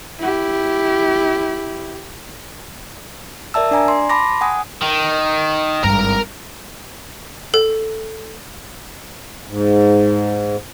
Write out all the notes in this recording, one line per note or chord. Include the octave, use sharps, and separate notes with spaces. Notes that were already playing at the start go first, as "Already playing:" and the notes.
E4 G4
A#4 D5 E5 A5 E6
D4 D5 G#5 A#5
C6
A5 B5 C6 D6 A#6
F#5 G#5 D#6
D#3
G#1 G2 A#4 A#5
A4
G#2